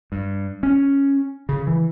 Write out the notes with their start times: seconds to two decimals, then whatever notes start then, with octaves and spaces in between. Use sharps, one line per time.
0.12 G2
0.63 C#4
1.49 C#3
1.67 E3